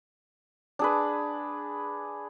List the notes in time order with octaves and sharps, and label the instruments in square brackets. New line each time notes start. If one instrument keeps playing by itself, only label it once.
[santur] D4 G#4 B4